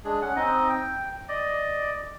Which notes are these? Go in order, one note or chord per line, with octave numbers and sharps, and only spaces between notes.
G#3 D4 G#4
C#4 F#5
C4 D#4 D#5
G5
D5 D#5